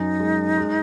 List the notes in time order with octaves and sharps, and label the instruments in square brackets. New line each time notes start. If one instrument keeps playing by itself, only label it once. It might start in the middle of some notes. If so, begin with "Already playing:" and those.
Already playing: [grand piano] F#2 [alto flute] D#4
[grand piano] G#3
G#3